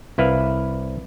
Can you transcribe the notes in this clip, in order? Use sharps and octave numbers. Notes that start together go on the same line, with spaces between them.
C2 E4 B4 F5